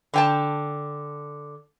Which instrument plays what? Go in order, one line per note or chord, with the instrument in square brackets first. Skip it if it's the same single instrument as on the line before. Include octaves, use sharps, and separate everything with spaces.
[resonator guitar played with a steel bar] D3 G5 A5